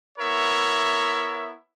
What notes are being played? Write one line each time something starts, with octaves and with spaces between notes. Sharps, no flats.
B3 E4 A#4 C#5 E5